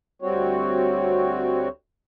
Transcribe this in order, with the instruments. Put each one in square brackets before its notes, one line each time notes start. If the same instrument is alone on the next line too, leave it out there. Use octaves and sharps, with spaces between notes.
[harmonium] D2 G3 C4 F#4 C#5